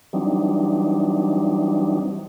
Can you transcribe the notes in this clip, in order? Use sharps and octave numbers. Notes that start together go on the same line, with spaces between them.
E3 F#3 G3 C4 D4 D#4